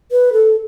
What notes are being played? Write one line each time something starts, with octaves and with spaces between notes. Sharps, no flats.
B4
A4